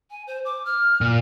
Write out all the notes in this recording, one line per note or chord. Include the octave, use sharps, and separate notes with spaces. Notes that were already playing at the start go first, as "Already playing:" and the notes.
G#5
C5
D6
F6
A#2